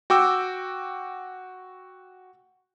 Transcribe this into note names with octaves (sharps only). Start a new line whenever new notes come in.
F#4 G5 D6 E6